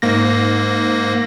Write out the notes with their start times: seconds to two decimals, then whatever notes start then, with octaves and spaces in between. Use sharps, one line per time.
0.02 G#2 A#3 A#6